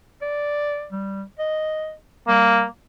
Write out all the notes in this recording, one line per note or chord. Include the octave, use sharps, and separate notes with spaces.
D5
G3
D#5
G3 A#3